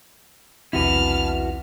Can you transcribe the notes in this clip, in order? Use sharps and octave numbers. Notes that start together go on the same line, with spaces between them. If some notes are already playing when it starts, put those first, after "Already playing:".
B1 E2 C3 E4 F#4 B4 A5 F6